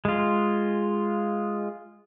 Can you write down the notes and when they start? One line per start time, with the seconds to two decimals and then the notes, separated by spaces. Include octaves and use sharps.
0.05 G#3 F4